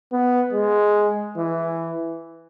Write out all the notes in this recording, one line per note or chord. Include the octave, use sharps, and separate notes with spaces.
B3
G#3
E3